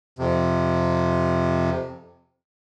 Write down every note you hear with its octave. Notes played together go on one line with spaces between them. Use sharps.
F2 C3